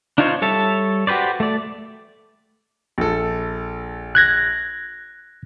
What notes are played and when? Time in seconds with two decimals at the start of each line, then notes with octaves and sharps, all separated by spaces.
0.18 D4 D#4 F4 C5 C#5
0.42 G3 A4 C#5 E5 A5
1.07 F#4 G4 B4 C5 D5
1.40 A3 D5
2.98 A#1 A4
4.15 F#6 G#6 A#6